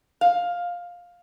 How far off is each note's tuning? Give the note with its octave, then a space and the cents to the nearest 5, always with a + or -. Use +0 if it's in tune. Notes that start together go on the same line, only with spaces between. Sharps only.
F5 +10